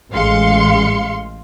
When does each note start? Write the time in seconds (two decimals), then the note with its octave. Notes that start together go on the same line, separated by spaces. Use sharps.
0.12 A1 G#3 F5 C6 C#7